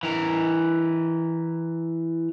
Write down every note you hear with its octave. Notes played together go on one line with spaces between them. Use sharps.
E3 A#4